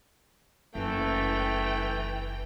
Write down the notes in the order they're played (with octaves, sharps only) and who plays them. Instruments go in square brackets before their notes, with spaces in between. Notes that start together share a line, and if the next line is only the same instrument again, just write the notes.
[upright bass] F#1 [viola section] E3 G5 [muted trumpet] A3